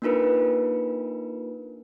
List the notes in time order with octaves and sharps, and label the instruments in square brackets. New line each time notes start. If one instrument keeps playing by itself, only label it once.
[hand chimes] A#3 D4 D#4 F4 A#4 B4